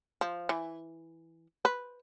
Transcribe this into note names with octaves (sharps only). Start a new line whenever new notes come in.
F3
E3
B4